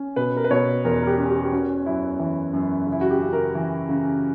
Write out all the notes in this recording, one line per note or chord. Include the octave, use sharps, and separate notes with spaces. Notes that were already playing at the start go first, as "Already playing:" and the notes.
Already playing: C#4
B2 B4
A#4
B4
B2 C#5
E2 A#4
A#4
G4
C#4
G4
G4
C#4 F#4
F#2 E4
E3
F#2
C#3
E4
F#4
G4
C#3
A#4
E3
C#3